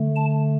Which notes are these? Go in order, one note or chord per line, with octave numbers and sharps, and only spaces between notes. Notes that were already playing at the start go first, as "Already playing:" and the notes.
Already playing: D3 A3
A5